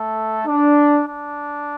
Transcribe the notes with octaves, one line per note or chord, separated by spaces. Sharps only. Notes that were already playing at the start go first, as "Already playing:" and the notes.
Already playing: A3 A4
D4
D4